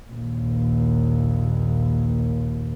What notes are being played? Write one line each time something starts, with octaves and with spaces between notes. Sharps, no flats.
A#1 D#2